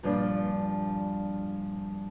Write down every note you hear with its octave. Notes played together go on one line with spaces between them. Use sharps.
G2 A#2 F3 G3 C#4 D4